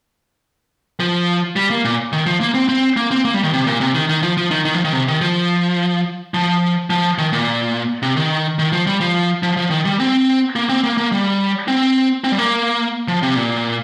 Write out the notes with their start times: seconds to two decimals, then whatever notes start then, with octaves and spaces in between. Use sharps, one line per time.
1.00 F3
1.56 G3
1.70 A#3
1.85 A#2
2.12 D#3
2.26 F3
2.40 A#3
2.54 C4
2.69 C4
2.97 A#3
3.11 C4
3.25 A#3
3.34 G3
3.43 D#3
3.53 C3
3.67 A#2
3.81 C3
3.95 D#3
4.09 D#3
4.23 F3
4.37 F3
4.51 D#3
4.65 D#3
4.74 F3
4.84 D#3
4.93 C3
5.08 D#3
5.21 F3
6.34 F3
6.90 F3
7.18 D#3
7.33 A#2
8.02 C3
8.17 D#3
8.59 D#3
8.73 F3
8.87 G3
9.00 F3
9.43 F3
9.57 F3
9.71 D#3
9.85 G3
10.00 C4
10.56 A#3
10.69 C4
10.84 A#3
10.97 A#3
11.12 G3
11.68 C4
12.24 C4
12.32 G3
12.38 A#3
13.08 F3
13.23 C3
13.36 A#2